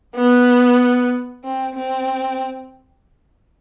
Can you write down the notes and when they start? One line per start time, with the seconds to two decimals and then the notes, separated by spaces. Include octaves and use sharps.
0.15 B3
1.44 C4
1.75 C4